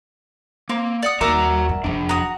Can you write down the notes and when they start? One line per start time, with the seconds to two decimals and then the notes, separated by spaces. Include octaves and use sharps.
0.69 A#3 C4
1.03 D5 F#5 D#6
1.21 D#2 G3 F#4 A#4 E5 A#5 D6
1.69 G2
1.84 F1 F2 F3 G#3 D4
2.09 F#4 A#5 D#6